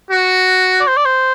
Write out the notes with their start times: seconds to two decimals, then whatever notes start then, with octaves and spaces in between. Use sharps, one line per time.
0.10 F#4
0.80 D5
0.88 C5
0.97 D5
1.05 C5